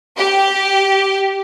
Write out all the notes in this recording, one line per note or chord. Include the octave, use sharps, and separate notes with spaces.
G4